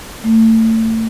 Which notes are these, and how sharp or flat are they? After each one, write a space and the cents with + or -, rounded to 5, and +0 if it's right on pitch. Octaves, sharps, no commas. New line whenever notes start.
A3 +30